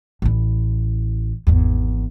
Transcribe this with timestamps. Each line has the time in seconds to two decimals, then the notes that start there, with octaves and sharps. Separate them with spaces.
0.22 A1 E4
1.47 G#1 E2